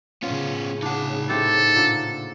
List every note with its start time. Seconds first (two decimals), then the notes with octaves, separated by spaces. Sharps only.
0.23 A2 C#3 B3 C#4 F4
0.82 B3 D4 D#4 A5
1.29 E4 G4 A4 C5
1.76 A#2 D3 A#3